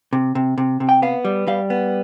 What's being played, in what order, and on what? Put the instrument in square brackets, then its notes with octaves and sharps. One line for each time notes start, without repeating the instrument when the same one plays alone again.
[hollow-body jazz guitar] C3
C3
C3
C3
G5
B3 F5
G3
G3 F5
B3